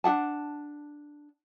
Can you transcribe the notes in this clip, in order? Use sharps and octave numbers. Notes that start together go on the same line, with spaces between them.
D4 G#4 F#5 A5